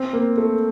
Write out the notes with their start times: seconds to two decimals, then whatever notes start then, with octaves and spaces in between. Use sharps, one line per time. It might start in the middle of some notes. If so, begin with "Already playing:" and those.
Already playing: C4
0.13 A#3
0.37 A3